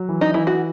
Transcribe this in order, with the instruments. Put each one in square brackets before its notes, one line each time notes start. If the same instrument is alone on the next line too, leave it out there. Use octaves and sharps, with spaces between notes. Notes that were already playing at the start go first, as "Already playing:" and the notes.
Already playing: [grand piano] F#3
E3
[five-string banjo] D#4
[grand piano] E3 [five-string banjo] E4
[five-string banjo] F#4